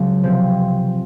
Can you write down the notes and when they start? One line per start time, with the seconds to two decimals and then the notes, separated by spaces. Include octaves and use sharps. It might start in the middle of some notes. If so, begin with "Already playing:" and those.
Already playing: C#2 C#3 F#3
0.23 C3 F3 C4